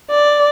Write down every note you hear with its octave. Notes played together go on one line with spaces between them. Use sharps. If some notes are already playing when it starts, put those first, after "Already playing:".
D5